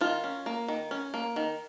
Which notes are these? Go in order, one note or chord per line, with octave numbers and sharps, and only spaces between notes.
D#3 F4
C#4
A#3
D#3
C#4
A#3
D#3